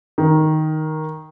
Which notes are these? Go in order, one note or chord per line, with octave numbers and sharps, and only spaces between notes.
D#3